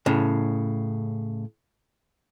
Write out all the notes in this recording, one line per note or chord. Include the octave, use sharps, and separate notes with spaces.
A2 C#3